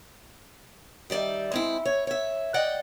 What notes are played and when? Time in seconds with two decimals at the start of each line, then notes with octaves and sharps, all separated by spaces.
1.10 D#3 G3 D5 E5
1.52 G#3 C4 E4
1.85 C#5
2.07 C#5 E5
2.54 D5 D#5 F#5 G5